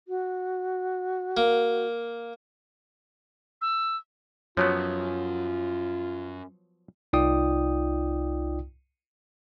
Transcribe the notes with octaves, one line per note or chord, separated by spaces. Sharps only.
F#4
A#3
E6
F#2 F3 F#3 B3 F4 C#5
C2 D#4 F4 D5 G5 D#6